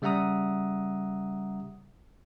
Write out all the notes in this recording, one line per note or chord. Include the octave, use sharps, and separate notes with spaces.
C#3 G3 E5 F#5 A#5 D#6